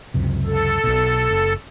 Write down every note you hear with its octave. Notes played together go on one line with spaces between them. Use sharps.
C#2 F#2 C3
A4
B1 B2
F#1